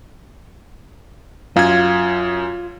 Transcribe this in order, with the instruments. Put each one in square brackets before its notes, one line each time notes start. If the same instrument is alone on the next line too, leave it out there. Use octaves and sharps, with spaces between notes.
[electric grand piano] F#2 G#6 [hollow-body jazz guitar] F4